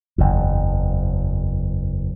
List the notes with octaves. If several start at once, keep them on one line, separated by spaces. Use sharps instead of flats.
F#1 E2